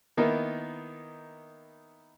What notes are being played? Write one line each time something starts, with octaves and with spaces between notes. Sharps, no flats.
D#3 A#3 B3 D#4 E4